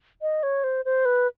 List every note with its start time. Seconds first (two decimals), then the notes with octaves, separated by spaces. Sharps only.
0.22 D#5
0.43 C#5
0.64 C5
0.85 C5
1.05 B4